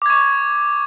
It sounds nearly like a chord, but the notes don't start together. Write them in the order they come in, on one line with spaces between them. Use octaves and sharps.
D6 G#6 C#6